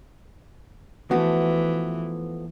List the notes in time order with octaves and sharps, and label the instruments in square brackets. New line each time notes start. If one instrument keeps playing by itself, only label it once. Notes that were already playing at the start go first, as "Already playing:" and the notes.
[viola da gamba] E3 [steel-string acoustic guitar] F3 A3 F#4 [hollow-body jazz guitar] B3